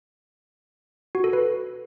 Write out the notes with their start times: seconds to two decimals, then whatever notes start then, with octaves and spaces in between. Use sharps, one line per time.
1.15 F#4
1.24 A4
1.33 B4